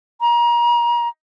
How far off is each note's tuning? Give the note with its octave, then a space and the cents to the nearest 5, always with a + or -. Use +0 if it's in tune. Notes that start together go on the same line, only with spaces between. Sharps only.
A#5 +30